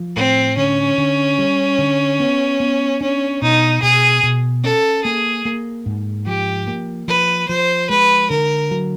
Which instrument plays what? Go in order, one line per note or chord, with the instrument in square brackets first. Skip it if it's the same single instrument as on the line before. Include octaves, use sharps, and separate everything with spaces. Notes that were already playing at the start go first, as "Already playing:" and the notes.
Already playing: [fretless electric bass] F3
[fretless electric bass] A2 [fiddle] C4
[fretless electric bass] D3 [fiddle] C#4
[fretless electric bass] D3
G3
D3
B3
B3
[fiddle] C#4 [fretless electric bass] D4
[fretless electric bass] B2 [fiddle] D#4
[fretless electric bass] B2 [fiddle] G#4
[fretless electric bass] B2
[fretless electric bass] C#4 [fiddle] A4
[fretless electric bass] A#3 [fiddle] G#4
[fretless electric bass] A#3
G#2
[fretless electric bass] F3 [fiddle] G4
[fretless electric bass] A#3
[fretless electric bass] F3 [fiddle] B4
[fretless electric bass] F3 [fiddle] C5
[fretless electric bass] G#3 [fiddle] B4
[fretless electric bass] D3 [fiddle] A#4
[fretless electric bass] F#3